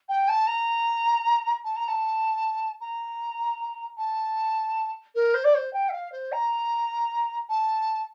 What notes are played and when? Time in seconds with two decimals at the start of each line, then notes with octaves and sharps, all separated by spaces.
0.09 G5
0.28 A5
0.47 A#5
1.64 A5
1.76 A#5
1.88 A5
2.81 A#5
3.97 A5
5.15 A#4
5.34 C5
5.44 D5
5.54 C5
5.73 G5
5.89 E5
5.92 F5
6.12 C5
6.32 A#5
7.49 A5